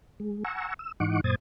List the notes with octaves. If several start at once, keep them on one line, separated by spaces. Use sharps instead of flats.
G#3
F#5 G#5 A#5 C#6 E6
E6
G#2 E3 D#4 F#5 C#6 D6
F#2 A#2 C5 D#6 G#6 A6